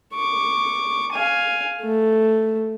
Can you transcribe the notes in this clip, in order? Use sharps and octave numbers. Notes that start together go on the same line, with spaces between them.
C#6 D6
F5 G#5
A3